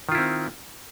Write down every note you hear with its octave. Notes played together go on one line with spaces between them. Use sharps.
D#3 C4 E4 F4